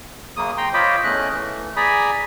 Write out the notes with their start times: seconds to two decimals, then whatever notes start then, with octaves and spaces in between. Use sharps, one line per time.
0.37 F#2 C#3 A#3 D#6
0.58 G5 A#5 C6
0.74 F4 C5 C#5 D#5 B5 D6
1.04 E2 A3 C#4 D#5 F#6
1.32 E3 A3
1.76 G#4 D5 G#5 A#5 B5 D#6